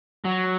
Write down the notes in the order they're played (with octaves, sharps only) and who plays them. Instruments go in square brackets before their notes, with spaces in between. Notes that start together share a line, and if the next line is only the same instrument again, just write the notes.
[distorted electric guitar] F#3